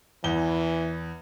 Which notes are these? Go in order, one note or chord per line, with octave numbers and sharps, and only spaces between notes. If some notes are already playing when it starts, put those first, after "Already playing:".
E2 E3 G7